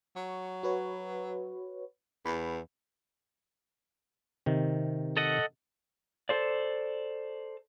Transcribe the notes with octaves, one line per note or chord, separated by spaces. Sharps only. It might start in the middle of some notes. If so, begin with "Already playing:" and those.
F#3 C#6
F#4 B4 C#5
E2 B5
C3 D#3
A4 D#5 F#5
A4 C5 D5